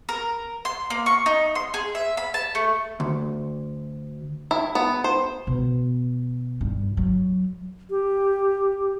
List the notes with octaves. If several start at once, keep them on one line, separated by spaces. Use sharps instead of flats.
A#4
C6
A#3
C#6
D#4
C6
G#4
E5
B5
A5
A3
D2
E4
B3
C5
B2
G2
F#3
G4